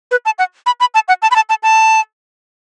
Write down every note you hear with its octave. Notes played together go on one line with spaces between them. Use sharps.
B4
A5
F#5
B5
B5
A5
F#5
A5
B5
A5
A5
A5